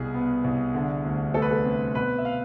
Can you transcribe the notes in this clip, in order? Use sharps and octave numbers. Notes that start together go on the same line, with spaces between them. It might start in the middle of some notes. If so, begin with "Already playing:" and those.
Already playing: C2 B2 G#4
B3
C2
D3
D2
A3 A4
B4
A4
C4
B2 B4
E5
F5